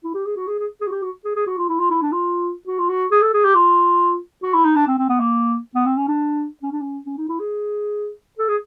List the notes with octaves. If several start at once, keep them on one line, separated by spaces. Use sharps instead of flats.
E4
G4
G#4
F#4
G#4
G#4
G#4
F#4
G4
F#4
G#4
G#4
F#4
F4
E4
F4
E4
D4
F4
F#4
F4
F#4
G#4
A4
G#4
G4
F4
F#4
E4
D#4
D4
C4
C4
B3
A#3
B3
C4
C#4
D4
C#4
D4
C#4
C#4
D#4
E4
G#4
A4
G#4